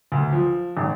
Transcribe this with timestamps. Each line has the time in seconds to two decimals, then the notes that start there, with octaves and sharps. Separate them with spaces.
0.12 D2
0.33 F3
0.77 G#1